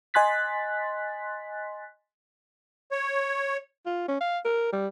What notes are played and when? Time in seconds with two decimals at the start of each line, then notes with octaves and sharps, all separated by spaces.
0.14 D#5 G#5 C6 F#6 A6 B6
2.91 C#5
3.86 F4
4.08 C#4
4.21 F5
4.45 A#4
4.73 G3